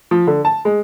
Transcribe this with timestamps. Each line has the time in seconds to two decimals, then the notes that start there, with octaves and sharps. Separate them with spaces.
0.11 F3
0.27 D3
0.45 A5
0.65 G#3